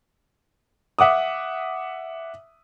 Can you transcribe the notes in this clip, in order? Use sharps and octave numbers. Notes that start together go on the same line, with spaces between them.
E5 F#5 D6 D#6